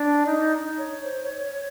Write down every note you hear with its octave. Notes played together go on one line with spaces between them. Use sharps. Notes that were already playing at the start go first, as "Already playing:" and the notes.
Already playing: D4
D#4
C#5
C5
C#5
C#5